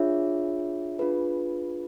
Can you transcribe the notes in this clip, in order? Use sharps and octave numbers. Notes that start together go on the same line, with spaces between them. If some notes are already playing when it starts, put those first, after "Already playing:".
Already playing: D4 F4 G#4 C#5 E5
D4 F4 G#4 B4